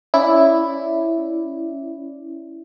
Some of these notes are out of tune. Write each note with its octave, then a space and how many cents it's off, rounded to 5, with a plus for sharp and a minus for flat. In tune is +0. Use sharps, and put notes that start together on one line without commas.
C#4 +0 E4 +0 D5 +0